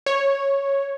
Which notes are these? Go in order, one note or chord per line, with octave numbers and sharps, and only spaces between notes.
C#5